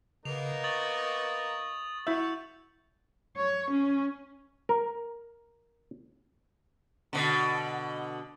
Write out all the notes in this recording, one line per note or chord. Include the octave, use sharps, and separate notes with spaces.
C#3 A#3 B3 D#4 F7
C#6 D#6 A6 F#7
E4 F#4 E5 C#6 E6 G6
C#5
C#4
A#4
B2 D3